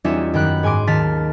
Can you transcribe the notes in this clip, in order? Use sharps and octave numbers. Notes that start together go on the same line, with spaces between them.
E2 G3 C#4 D#4 F4 E5
F#2 D#3 G5 B5 F#6
G#2 G#5 C6 D6 D7
D#2 D#3 A5 F6 A6 B6